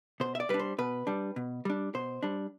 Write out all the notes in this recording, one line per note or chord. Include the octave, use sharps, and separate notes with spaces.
B2 C5
E5
D5
G3 D4 B4
C5
B2 B4
G3 D4
B2
G3 D4
B2 C5
G3 D4